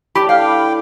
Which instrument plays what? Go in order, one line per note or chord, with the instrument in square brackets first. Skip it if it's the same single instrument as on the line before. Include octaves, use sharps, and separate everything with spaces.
[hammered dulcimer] A2 D4 [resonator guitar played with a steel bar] G4 [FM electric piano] B5 D6
[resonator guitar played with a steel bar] F5 [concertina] G5